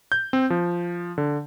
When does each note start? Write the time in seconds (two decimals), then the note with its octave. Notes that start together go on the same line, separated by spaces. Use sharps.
0.12 G6
0.33 C4
0.50 F3
1.18 D3